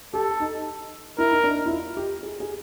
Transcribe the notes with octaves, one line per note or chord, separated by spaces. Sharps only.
G4 A4
D#4
E4 A#4
D#4
D4
D#4
E4
F4
G4
G#4
G#4